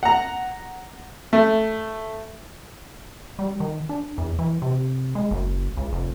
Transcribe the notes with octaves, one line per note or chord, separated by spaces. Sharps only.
F#5 A#5
A3
G3
D#3
D4
E2
E3
C3
G#3
F#1
C#2
F1